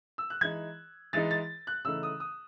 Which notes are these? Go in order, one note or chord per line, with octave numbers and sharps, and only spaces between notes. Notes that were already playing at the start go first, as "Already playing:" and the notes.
E6
F#6
E3 G#3 D#4 G#6
E3 G#3 D#4 A6
A6
F#6
C#3 E3 A3 D#4 E6
D#6
D#6